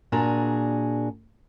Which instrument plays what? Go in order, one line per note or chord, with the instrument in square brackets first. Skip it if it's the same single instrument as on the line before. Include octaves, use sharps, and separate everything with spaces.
[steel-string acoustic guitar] A#2 D4 F#4 G#4 A#5